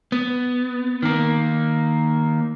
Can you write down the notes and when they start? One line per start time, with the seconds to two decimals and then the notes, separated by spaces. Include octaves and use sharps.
0.12 B3
1.02 D#3 A#3